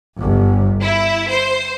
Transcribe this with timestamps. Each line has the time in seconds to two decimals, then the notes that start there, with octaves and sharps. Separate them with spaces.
0.20 G1
0.81 E4
1.30 C5